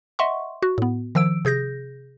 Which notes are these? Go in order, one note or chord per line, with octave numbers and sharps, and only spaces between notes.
D#5 E5 F#5 C6 C#6
F#4
A2 B3
D#3 F3 E6 D7
C3 G#4 G6 A#6